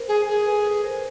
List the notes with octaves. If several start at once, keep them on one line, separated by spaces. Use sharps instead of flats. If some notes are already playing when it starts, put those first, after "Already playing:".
Already playing: A#4 C5
G#4
G#4
A4 B4
A4 B4
A#4 C5